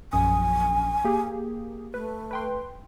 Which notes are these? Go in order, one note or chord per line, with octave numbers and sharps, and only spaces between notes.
A#1 F#2 G#5 D#6
A#3 G4 G#4
A3 B4
B4 G5 C6